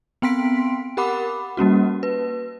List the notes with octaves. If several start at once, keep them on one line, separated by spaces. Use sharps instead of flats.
B3 C4 G5 C6 B6 D7
G4 A#4 F#5 B5 D6
G3 A#3 C#4 F#4
B4